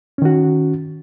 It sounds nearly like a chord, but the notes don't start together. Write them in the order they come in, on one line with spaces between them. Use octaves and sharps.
C#4 D#3 F#4